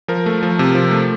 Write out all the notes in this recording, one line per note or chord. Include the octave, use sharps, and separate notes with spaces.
F3 A#4
A3
F3
C3
F3
A3